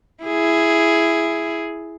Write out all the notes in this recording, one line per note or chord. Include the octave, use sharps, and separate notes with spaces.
E4 G#4